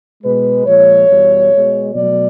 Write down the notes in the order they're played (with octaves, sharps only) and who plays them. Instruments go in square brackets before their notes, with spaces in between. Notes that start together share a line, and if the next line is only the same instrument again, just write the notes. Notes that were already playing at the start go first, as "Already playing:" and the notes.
[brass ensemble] B2 G#3 B4
A#2 F3 G#3 C#5
E2 B2 G3
B2 G#3
B2 F#3 A3 D5